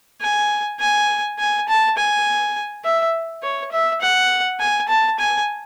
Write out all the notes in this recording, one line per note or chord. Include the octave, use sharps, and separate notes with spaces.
G#5
G#5
G#5
A5
G#5
E5
C#5
E5
F#5
G#5
A5
G#5